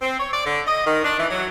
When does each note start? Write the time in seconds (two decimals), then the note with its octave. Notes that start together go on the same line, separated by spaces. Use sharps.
0.01 C4
0.20 C#5
0.33 D5
0.46 D3
0.67 D#5
0.86 D#3
1.04 D4
1.18 E3
1.30 F#3